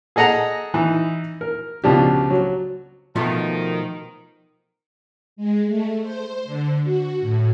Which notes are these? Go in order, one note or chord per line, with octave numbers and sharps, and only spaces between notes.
G#4 A4 D#5 F#5 A#5
E3 D#4
A#4
C#2 B2 F3 D4 G4
F#3
B2 D#3 F3 A3
G#3
A3
C5
D3
F#4
A2